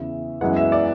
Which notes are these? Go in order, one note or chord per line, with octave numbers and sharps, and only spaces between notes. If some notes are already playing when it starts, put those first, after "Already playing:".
Already playing: E2 C#3 E3 E5
F#2 E3 G#3 B3 F#5
E5
D5